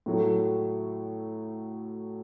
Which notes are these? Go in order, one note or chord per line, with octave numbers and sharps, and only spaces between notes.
A2 F#3 A3